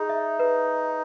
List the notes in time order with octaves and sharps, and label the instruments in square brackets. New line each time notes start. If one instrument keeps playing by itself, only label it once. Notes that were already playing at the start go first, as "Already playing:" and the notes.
Already playing: [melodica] D#4 [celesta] G#4
[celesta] E5
B4